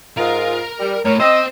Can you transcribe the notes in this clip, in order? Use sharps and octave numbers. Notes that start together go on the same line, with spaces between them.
G#2 F4 A#4
G3
A2 A#4 C#5
C4 C5 D#5 G5